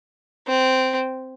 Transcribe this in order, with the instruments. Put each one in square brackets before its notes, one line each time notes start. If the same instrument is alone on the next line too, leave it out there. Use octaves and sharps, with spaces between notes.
[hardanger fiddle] C4